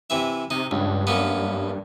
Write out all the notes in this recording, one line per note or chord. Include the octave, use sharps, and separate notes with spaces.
C3 E3 E5
C3 D#4
C#2 G2
F#2 A#3 B3